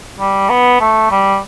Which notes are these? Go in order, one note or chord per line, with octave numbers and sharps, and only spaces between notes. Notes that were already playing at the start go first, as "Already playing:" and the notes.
G3
B3
A3
G3